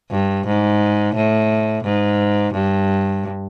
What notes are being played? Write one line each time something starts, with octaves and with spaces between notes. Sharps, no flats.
G2
G#2
A2
G#2
G2